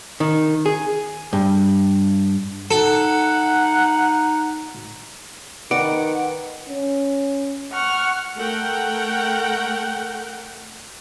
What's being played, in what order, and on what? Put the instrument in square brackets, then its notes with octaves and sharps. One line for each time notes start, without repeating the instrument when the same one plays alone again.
[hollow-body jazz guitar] D#3
G#4
G2
[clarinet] D#4 [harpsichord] A4 [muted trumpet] F#5
[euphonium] D#3 [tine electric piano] B4 [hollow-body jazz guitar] D5 [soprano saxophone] F#5
[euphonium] C#4
[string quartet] F#5 C#6 F6
[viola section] A3 A#4 F#5 G5